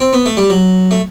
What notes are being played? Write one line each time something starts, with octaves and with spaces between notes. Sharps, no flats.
C4
B3
A3
G3
F#3
A3